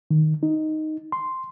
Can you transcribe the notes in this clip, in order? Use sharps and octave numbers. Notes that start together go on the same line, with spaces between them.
D#3
D#4
C6